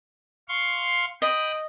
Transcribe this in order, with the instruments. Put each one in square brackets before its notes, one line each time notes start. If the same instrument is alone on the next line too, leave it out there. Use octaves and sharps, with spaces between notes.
[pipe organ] F5 C6 C#6
[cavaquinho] D#5 [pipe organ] G5 B5 D#6